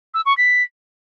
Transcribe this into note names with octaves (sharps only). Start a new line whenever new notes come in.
E6
C#6
B6